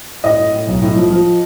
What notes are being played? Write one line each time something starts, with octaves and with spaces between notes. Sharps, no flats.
A2 D#5
A2
A2
B1
A2
F3
F3